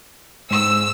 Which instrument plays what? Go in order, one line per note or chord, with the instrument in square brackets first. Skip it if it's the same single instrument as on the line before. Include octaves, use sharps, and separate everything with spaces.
[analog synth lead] G#2 [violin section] E6